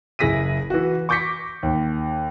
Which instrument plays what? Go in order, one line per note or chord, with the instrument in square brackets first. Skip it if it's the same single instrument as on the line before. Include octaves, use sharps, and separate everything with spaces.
[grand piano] F#1 E4 G#4 A#6 B6 D#7
E3 F#4
C#6 D6 G6 A#6 B6 C#7
D#2